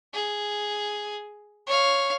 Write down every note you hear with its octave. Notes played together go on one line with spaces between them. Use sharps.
G#4
C#5 F5